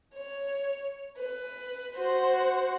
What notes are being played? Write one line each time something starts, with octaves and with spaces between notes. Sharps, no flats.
C#5
B4
F#4 C5